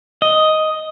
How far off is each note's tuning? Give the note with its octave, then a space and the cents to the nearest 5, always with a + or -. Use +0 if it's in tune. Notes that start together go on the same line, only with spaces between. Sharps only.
D#5 +5